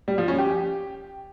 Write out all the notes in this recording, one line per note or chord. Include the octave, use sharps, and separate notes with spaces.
G3
F3
C#4
G4